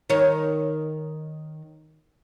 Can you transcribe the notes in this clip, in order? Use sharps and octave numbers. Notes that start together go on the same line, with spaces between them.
D#3 C#5